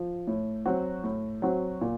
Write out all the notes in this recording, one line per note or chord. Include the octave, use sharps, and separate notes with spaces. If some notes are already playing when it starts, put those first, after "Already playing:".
Already playing: F3
A2
F#3 C4 F#4
A2
F#3 C4 F#4
A#2